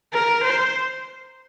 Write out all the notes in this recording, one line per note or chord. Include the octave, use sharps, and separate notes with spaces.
A#4
C5